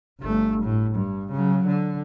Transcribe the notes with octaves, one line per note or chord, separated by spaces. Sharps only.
G1 A3
A2
G2
C#3 F#3
D3